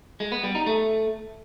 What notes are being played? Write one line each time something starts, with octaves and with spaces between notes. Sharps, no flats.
G#3
B3
G3
D#4
A3